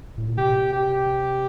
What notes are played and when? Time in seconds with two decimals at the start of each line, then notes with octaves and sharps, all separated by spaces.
0.18 A2
0.28 A#2
0.38 C3 G4
0.73 G4